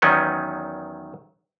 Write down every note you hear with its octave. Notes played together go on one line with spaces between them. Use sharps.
E2 D#3 F#3 B3 C#4 D#4